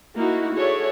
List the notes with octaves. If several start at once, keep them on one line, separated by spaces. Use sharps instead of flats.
A#3 D#4 E4 F#4
F#4 G#4 A4 C#5 D5 E5